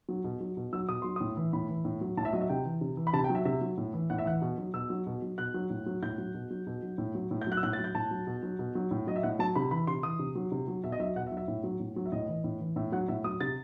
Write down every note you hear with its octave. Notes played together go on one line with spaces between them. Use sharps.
F#3
B2
F#3
B2
F#3 E6
B2 D#6
F#3 C6
A2 D#6
E3
A2 B5
E3
A2
F#3
A2 A5
E5
F#3 D#5
E5
C3 G5
E3
C3
E3
B5
C3 A5
G5
F#3
E5
C3 E5
F#3
A2
E3
A2 F#5
E5
E3 F#5
B2
F#3
B2 E6
F#3
B2
F#3
B2 F#6
F#3
A2
F#3
A2 G6
F#3
B2
F#3
B2
F#3
A2
F#3
A2
G6
F#3 F#6
E6
A2 F#6
A6
F#3
G6
A2 A5
F#3
B2
F#3
B2
F#3
A2
F#3 D#5
E5
A2 F#5
F#3 A5
C3 B5
E3 B5
C3 C6
E3 D#6
C3
F#3
C3
F#3
B2 E5
D#5
F#3 E5
B2 F#5
E5
F#3
E5
A2
F#3
A2
F#3
E5
A2 D#5
E3
A2
E3
A2 E5
F#3 F#5
A2 E5
F#3 D#6
C3 A6